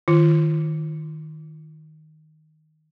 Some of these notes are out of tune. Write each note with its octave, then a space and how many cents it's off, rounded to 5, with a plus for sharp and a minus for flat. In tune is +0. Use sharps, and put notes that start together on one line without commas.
D#3 +0 F4 -30